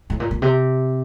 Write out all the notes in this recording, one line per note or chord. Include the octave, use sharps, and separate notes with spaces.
A2
A#2
A#2
C3